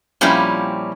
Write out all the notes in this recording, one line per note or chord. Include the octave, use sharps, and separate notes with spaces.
A#2 F3 G3 C4 C#4 E4